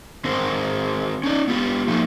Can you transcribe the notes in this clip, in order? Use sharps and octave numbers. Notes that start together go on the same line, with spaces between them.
D#3 C4 A#4 C5
C#4 D#4 D5
B3 F4 G4
F3 A3 A#3 D#4